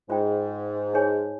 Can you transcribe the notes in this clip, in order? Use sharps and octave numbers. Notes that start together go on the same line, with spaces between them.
G#2 F4 C5 G5
D#4 G#4 C#5 G#5